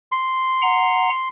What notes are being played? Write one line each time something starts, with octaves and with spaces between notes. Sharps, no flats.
C6
F#5 A#5